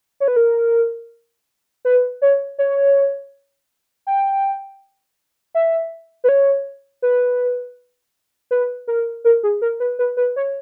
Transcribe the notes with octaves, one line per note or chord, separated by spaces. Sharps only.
C#5
B4
A#4
B4
C#5
C#5
G5
E5
B4
C#5
B4
B4
A#4
A#4
G#4
A#4
B4
B4
B4
C#5